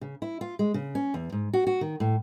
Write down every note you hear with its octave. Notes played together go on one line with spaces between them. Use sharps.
C#3
E4
F4
G#3
C#3
C#4
E2
G#2
F#4
F#4
D#3
A2